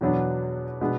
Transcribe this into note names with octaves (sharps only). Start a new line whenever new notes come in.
E2 B2 F#3 B3 D4
B2 G#3 B3 D4